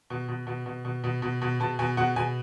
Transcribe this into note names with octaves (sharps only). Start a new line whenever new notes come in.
B2
B2
B2
B2
B2
B2
B2
B2
B2 A5
B2 G#5
B2 F#5
B2 G#5